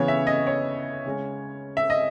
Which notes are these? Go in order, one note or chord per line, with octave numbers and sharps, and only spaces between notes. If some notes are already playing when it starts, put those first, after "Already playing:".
Already playing: C#3 E3 B3 C#5
E5
D#5
C#5
C#3 G#3 C#4
E5
D#5